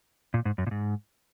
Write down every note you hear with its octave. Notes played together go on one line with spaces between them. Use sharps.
A#2
G#2
F#2
A#2
G#2